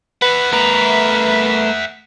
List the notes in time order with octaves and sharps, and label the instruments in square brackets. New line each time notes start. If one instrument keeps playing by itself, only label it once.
[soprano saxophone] B4 [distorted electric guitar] E5 F#5
[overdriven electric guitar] A3 A#4 [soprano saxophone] B4